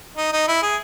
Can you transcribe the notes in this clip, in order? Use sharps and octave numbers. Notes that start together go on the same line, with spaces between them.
D#4
D#4
E4
G#4